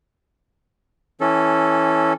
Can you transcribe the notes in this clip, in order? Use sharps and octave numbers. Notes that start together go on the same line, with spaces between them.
E3 C#4 A4